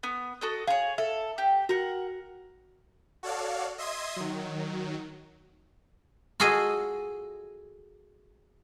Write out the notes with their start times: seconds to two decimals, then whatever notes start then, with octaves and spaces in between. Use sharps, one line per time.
0.03 B3
0.41 F#4 A4 D#5
0.67 G#4 C#5 F5
0.98 A4 E5
1.38 G4
1.69 F#4 A#4 F#5
3.23 F#4 A4 C#5 D5 F5
3.78 D#5 E5 C6 D#6 G#6
4.16 D#3 F#3
6.40 F4 F#4 G#4 A4 D#5